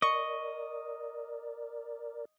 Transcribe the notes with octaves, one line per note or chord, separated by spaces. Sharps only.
A#4 D5 D#5 C#6